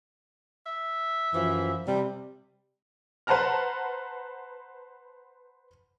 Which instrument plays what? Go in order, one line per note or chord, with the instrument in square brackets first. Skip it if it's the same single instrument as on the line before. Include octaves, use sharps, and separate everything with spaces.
[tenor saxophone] E5
[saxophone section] F#2 E3 F3
C3 G3
[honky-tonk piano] B4 C5 F#5 A5 A#5 F6